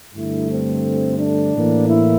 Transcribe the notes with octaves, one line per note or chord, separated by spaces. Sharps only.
G2 D3 A3 E4
C4
D4
A2 E3 A#3
E4